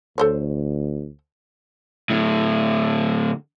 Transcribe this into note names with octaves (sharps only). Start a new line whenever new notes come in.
D2 A4 C5 C#5
A2 D3